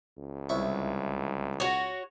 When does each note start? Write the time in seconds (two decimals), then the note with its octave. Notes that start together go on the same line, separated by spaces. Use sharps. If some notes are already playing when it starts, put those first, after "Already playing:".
0.18 C#2
0.49 C2 E4 C#6
1.60 F#4 C#5